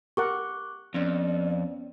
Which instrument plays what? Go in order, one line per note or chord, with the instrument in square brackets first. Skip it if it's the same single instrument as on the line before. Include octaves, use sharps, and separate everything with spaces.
[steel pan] G4 A#4 F#5 [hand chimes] C#6 D6 F#6
[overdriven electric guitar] F2 [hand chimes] B3 C#4 [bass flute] D5